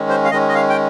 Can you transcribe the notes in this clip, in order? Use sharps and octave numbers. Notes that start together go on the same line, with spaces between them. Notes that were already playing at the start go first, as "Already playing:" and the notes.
Already playing: D#3 G#3 C#4
C5
F5
D#3 G#3 C#4 D#5
D#5
F5
G5